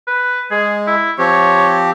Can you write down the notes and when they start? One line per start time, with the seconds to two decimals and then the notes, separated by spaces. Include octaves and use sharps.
0.08 B4
0.51 G#3 G#4
0.87 E4
1.19 F3 C4 G4 C#5